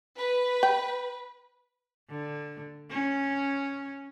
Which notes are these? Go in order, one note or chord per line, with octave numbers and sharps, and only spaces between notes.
B4
G5
D3
C#4